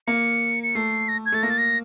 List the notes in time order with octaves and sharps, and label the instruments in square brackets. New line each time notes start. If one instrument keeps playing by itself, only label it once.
[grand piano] A#3 [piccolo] C#7
[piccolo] C#7
[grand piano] A3 [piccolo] C7
[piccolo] A#6
G#6
[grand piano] A3 [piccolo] A6
[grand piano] A#3 [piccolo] A#6
[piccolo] A6
A#6